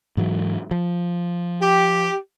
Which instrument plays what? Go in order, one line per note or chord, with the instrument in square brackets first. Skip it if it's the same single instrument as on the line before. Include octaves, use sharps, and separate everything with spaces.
[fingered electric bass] G#2 E3 F#3
F3
[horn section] G4